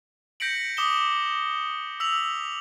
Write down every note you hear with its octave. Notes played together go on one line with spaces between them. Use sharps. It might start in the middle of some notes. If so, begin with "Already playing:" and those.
G6 A#6 B6 C#7 D7 F#7
D6 D#6 E7 G7
E6 B6 F7 F#7